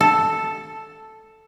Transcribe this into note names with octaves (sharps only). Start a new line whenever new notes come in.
A4